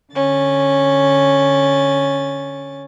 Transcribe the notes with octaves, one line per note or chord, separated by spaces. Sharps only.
D3 C#4 A6